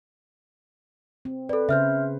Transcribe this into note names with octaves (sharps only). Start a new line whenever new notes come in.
C4
A4 B4 D5
C#3 C5 E5 F6 G6